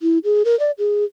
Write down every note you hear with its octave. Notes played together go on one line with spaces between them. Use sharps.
E4
G#4
A#4
D5
G#4